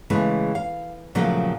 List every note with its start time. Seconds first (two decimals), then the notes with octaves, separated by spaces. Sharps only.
0.10 C#3 E3 G#3 A3
0.55 F5
1.15 A#2 C#3 F3 F#3 A3